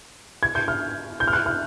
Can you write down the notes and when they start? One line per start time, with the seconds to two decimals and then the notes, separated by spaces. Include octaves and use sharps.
0.43 G#6
0.55 G6
0.68 F6
1.20 G6
1.28 F6
1.33 F#6
1.46 F6